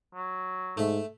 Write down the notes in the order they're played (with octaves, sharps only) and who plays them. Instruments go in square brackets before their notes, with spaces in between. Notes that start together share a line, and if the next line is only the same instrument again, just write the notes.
[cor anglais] F#3
[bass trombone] G#2 [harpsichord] A3 E5